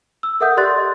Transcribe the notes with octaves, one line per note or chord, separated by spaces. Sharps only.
E6
A4 A#4 E5 F#5 D#6 G6
G4 D5 C6 F#6 A6
D#5